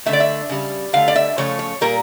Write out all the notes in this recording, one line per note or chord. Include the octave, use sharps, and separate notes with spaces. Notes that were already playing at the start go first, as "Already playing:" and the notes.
D3 A3 E5
D5
E5
C#3 G3
D3 A3 F5
D5
E5
C#3 F3 A3 C#5
C#5
A#2 G3 A#4